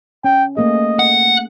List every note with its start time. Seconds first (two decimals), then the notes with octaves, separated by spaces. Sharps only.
0.24 C#4 G5
0.57 A3 A#3 G#4 D#5
0.99 F#5